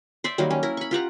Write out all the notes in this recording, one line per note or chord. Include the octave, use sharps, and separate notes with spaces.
C5 D5 E5
D#3 F#3 G3 A#3
C#4
E4 A#4
B5 C#6
F4 G4 F#5 A#5